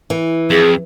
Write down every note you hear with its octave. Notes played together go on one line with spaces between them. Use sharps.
E3
F2 G#4